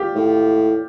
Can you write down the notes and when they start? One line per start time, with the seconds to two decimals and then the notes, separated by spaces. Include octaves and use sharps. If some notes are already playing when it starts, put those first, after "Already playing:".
Already playing: F4 G4
0.15 A2